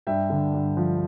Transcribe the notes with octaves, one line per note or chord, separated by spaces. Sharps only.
G2 E5 G5
D3
G2
F3